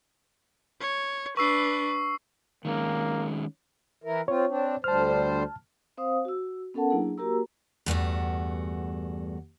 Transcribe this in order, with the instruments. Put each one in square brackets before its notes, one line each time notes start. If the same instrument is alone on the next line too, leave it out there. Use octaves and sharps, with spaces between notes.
[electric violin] C#5
[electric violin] D4 B4 [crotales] C#6 E6 C7
[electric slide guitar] D#3 G#3 C#4 [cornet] A#3
[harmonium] E3 E4 A#4
[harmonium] C4 F4 [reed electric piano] C#5
[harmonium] C4 D4
[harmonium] D2 G3 C5 [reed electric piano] A5 F6
[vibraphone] C4 C5 F5 D#6
F#4 E6
B3 C#4 A4 A#4 F#5 A5
F#3 A#3 D4 E4 G#4
A#3 F#4 G4 A#4 A#5 E6
[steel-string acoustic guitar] E2 G2 A3 F#4